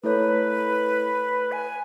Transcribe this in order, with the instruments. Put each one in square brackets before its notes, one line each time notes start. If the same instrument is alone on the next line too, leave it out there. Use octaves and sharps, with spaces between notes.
[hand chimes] A3 E4 A4 C#5 [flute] B4
[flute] G#5